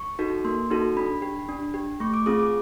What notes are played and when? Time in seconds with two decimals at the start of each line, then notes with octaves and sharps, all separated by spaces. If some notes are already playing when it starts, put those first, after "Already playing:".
Already playing: C#6
0.19 D#4 F#4 A4
0.45 A#3 C6
0.70 D#4 F#4 A4
0.97 D4 B5
1.22 G4
1.49 D4
1.74 G4
2.00 A3 C#6
2.14 D6
2.26 C4 F4 G#4 D#6
2.40 D6